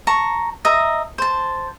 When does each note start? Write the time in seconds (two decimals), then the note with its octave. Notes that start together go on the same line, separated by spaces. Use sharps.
0.07 A5 A#5 C#6
0.65 D#5 E5 A#5
1.18 C5 A5